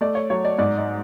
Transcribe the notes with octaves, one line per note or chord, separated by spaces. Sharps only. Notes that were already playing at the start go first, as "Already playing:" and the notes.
A3 D5
C#5
F#3 C#5
D5
G#2 D5
D5